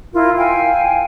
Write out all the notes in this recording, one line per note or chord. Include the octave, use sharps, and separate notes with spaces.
E4 F4 A#4
F5 G5 G#5